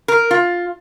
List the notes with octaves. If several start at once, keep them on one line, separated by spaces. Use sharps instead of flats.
A#4
F4